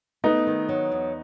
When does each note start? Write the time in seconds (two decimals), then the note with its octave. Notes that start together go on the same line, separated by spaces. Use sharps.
0.24 A3 B3 D#4
0.47 D#3
0.69 F#3
0.92 E2